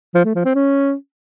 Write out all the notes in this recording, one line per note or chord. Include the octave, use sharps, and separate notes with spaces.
F3
A3
F3
C4
C#4